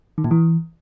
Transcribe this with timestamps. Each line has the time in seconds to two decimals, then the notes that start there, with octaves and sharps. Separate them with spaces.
0.18 D#3
0.24 A#2
0.31 E3